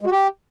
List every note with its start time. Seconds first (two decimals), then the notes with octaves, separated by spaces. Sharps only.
0.01 G#3
0.06 F#4
0.12 G4